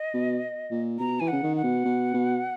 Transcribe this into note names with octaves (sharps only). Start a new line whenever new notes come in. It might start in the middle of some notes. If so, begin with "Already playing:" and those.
Already playing: D#5
B2
A#2
B2 A#5
E3 G#5
C#3 F#5
D#3
F#5
B2
B2
B2